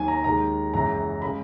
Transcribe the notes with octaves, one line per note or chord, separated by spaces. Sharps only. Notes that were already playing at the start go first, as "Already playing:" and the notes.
Already playing: D#2 D#3 F#3 G#5
A#5
D#2 D#3 G#3 A#5
F#1 F#2 E3 G#3 A#5
C#3 G#3 B5